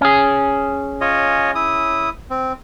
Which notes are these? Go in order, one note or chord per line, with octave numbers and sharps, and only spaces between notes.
C#4 G#4
F4 C#5 D#5
E4 D#6
C4